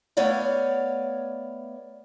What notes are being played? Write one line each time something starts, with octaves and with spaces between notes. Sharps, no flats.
A3 B3 C#5 D5 F5